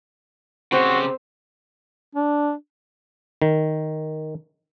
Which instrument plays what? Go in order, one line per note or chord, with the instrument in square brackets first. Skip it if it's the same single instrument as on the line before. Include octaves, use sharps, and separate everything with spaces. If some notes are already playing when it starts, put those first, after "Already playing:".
[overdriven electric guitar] C#3 G4 [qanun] C4 C5 [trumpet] F#4
[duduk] D4
[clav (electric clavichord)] D#3